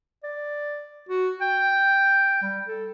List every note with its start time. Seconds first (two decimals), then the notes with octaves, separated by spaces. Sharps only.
0.24 D5
1.09 F#4
1.41 G5
2.42 G3
2.68 A4